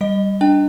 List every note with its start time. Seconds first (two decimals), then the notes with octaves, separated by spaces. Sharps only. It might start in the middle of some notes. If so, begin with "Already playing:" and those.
0.01 G3 D#5
0.41 D4 G5